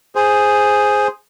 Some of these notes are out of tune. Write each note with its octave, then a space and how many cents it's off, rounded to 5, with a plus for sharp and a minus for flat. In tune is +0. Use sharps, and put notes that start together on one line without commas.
G#4 +0 C5 +0